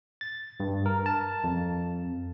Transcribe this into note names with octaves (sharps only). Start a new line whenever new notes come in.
A6
G2
A#4
A5
F2